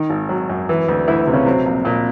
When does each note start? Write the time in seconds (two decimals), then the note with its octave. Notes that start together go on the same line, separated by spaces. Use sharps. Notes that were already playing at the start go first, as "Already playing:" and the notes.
Already playing: D#3 D#4
0.10 G#1
0.29 F#3
0.50 F#2
0.69 E3
0.88 D2
1.08 D2 E3 E4
1.27 C3
1.33 C#3 C#4
1.46 C3 F#3 C4
1.66 A#1
1.85 A#1 A#2 A#3